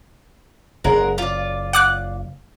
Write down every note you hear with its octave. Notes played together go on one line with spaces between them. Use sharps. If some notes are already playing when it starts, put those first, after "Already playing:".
F#1 G#3 A#4 F#5
F4 D5
F#5 D6 F#6